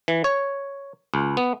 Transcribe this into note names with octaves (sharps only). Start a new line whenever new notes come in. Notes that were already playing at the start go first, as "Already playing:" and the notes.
E3
C#5
C#2
B3